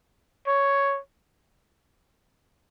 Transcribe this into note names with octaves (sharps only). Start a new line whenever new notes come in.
C#5